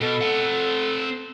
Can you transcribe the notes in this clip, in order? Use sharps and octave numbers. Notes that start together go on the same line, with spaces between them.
B2 A4
C4 F#5